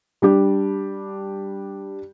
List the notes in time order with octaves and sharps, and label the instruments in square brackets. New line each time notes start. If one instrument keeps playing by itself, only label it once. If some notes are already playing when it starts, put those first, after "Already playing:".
[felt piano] G3 D4 G4